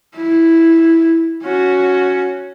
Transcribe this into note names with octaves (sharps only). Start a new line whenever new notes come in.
E4
C#4 F#4